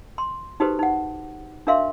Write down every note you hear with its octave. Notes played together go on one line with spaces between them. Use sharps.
C6
D#4 F#4 G4 A4 B4 C5
D#4 F#5
D4 F#4 A#4 E5 F5 C6